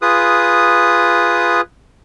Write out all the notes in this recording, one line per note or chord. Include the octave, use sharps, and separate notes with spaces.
F4 G#4 B4 D#6